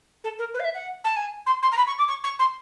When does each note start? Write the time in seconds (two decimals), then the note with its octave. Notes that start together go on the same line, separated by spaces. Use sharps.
0.24 A4
0.39 A#4
0.54 B4
0.60 F5
0.64 E5
0.74 F#5
1.04 A5
1.16 G#5
1.46 C6
1.62 C6
1.72 A#5
1.77 B5
1.87 C#6
1.98 D6
2.08 C#6
2.24 C#6
2.39 C6